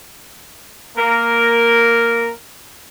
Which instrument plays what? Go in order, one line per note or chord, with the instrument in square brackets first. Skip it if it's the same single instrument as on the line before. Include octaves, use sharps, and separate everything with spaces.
[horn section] A#3 A#4